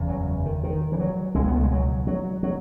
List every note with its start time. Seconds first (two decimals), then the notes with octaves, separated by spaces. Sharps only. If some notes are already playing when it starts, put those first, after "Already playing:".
Already playing: F#1 E2 C#3
0.09 F#3
0.46 D#3
0.63 D#3
0.92 E3
1.00 F#3
1.35 C#2 B2 G#3
1.47 B3
1.56 A3
1.64 G#3
1.71 F#3
2.07 F#3
2.43 F#3